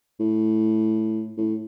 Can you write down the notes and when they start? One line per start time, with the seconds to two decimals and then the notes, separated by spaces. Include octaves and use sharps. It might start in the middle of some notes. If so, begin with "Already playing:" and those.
0.20 A2
1.37 A2